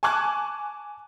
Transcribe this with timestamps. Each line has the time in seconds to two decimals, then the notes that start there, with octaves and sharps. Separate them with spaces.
0.03 G#5 A5 C#6 D6 F#6 G#6